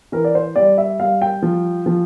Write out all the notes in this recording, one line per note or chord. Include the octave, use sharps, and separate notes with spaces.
E3 A#4
D5
C5
G3 D5
E5
G3 F5
G5
F3
F3